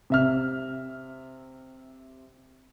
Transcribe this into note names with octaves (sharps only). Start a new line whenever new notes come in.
C3 E5 F6